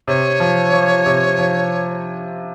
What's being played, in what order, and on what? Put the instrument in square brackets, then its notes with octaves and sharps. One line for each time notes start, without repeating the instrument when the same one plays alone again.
[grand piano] C3 [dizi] C#5
[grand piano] F3
F3
C3
F3